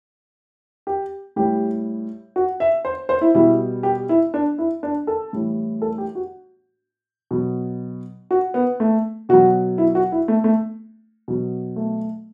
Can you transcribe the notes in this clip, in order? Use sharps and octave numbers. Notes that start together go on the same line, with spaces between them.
G4
A2 G3 G4
F#4
E5
C5
C5
E4
B2 G3 E4
G4
E4
D4
E4
D4
A4
A2 E3 G3
A4
G4
F#4
B2 F#3
F#4
B3
A3
B2 F#3 F#4
E4
F#4
E4
A3
A3
B2 F#3
A3